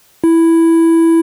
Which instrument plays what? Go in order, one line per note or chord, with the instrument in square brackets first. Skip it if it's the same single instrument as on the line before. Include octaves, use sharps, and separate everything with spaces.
[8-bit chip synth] E4